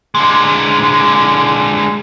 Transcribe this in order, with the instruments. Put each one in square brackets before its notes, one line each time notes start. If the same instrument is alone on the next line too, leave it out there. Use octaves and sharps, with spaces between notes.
[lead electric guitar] D3 G#3